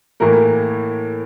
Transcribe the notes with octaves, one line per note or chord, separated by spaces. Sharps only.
A2 E3 A#3 A#4